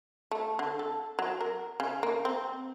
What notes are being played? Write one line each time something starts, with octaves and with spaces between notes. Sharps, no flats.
A3
D3
A4
F#3
A#4
C#3
A#3
C4